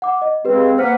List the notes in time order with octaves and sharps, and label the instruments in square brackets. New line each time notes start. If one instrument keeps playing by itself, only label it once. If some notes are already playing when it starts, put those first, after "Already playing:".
[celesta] F#5 D6
D#5
[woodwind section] C#3 G#3 C4 [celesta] G4 B4
[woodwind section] A#3 B4 F#5 [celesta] C5 F6